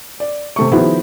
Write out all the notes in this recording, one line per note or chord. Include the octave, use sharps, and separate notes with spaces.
D5
C3 A3 C#6
D#3 F3 B3 E4 F#4 G#4